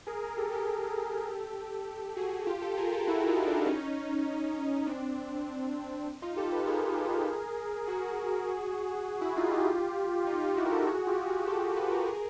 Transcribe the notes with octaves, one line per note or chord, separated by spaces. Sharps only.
G#4 A#4
G#4 A#4
G4 A4
G4 A4
G4 A4
F#4 G#4
F4 G4
G4 A4
G#4 A#4
G4 A4
E4 F#4
D#4 F4
D4 E4
C#4 D#4
C4 D4
D#4 F4
G4 A4
A4 B4
G#4 A#4
F#4 G#4
E4 F#4
D#4 F4
F4 G4
D#4 F4
D#4 F4
E4 F#4
A#4
G4 A4
F#4 G#4
F4 G4
F#4 G#4
G4 A4
G4 A4
A4 B4
G#4 A#4
G#4 A#4